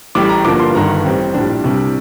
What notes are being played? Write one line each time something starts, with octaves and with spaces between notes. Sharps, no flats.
A1 A2 G3 D6
A#5
G1 G2 F3 A#3 D4 D6
C6
G1 G2 D#3 A#5
A1 A2 G3 C4
A#1 A2 G3 D4
C2 C3 G3 D4